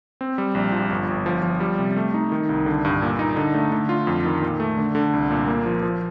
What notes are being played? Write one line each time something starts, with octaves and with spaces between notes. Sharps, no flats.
C4
G3
A#1
F3
G1
G1
F3
F3
G3
C3
A3
D#4
D#3
C2
D3
G2
A#2
D#4
D3
A3
D3
F4
F2
D#3
A#2
A3
D3
D3
C2
A#2
A#3
F3
F3